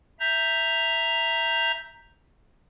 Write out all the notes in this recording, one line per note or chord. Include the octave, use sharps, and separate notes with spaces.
E5 A#5 G6